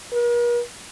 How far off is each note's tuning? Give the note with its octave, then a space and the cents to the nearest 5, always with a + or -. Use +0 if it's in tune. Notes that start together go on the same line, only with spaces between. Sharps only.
A#4 +45